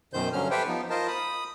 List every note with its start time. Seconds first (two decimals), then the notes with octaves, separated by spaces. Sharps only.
0.13 F#2 B2 D#3 C5 G6
0.33 G2 D3 F#3 C#4 F6
0.51 G4 A4 B4 C5 E5 G5
0.67 F3 B3 D#4
0.90 F4 A#4 C5 D#5 A5
1.08 B5 D#6